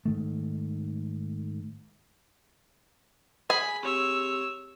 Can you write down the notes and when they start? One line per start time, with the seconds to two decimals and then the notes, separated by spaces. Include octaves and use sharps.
0.05 G#2 D#3 A3
3.50 G#4 G#5 B5
3.83 C4 G4 C#5 E6